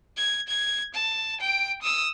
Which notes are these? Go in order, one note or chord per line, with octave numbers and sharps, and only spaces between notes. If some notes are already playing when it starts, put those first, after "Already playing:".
G#6
G#6
A5
G5 D7
D#6 E6